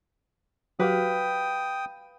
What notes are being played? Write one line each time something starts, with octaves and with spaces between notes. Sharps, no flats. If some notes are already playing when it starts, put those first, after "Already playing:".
F#3 F#4 G4 B4 F5 G5 D#6